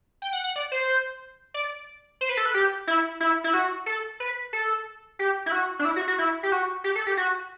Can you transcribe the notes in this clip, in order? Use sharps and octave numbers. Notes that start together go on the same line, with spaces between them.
G5
F#5
F#5
D5
C5
D5
C5
B4
A4
B4
G4
E4
E4
E4
F#4
A4
B4
A4
G4
E4
F#4
D4
E4
F#4
F#4
E4
G4
F#4
G4
A4
G4
F#4